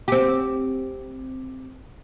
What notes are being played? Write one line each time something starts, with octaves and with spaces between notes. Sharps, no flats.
C4 G4